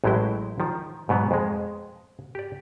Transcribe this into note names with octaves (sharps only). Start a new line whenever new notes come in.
A1 A2 F#3 G#3 E4 G5
D#3 F3
G#2 B2 F#3 B3
F2 G#3
G4 D5